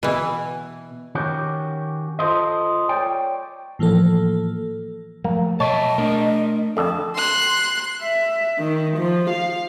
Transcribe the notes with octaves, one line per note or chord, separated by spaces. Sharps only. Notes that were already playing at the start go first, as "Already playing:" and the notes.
B2 E3
D#3 C#4 F#4 G4
F4 A4 C5 D#5
C#5 D5 G5
A2 E3 F3 A#3 A4
F3 F#3 A3 A#3
B2 C#5 D#5 E5 G5 A5
A3 D4 A#4
F2 D3 A5
C6 F#6
E5
D#3
F3
F5